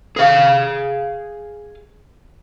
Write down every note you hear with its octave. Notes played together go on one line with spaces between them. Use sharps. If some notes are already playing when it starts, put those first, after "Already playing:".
G#4 F5